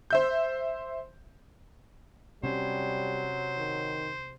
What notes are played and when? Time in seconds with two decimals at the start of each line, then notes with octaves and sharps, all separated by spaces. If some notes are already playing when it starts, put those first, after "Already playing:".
0.10 C5 E5 G6
2.43 C3 F#3 G3 C#4 C5
3.57 D#3